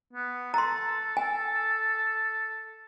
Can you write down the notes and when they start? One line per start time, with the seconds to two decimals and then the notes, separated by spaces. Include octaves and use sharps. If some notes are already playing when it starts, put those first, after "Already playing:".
0.13 B3
0.54 A4 A#5 C6
1.17 G#5